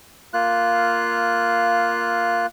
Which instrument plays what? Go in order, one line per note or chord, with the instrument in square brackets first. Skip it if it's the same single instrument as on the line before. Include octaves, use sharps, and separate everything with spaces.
[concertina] A#3 F4 F#6